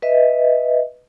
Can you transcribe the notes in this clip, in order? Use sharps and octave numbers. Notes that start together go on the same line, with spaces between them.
B4 D#5 E5